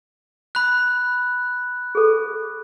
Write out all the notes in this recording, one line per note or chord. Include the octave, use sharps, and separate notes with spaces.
B5 F#6
G#4 A4